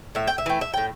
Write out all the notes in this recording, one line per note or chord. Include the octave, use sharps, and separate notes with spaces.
A2 E5
G5
E5
E3 A3 G5
E5
A2 G5